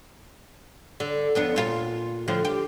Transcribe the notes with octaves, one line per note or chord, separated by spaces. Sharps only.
D3
F2 B3 D4
A#2 F4 A#4
A2 D3 F3
G4